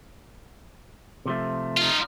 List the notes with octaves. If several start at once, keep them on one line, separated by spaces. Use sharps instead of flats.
C3 F3 A3
D#4 F4